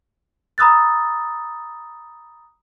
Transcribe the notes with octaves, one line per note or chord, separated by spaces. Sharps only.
A#5 B5 D#6 E6 F#6 A6